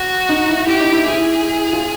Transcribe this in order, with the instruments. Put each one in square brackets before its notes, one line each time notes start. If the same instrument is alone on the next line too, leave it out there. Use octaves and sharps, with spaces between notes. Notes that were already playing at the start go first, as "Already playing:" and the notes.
Already playing: [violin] F#4
[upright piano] D#4
E4
[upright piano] E4 [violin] G4
[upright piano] D#4
E4
[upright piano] E4 [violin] G#4
[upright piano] F4